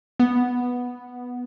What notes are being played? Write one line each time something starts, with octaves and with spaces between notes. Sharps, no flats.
B3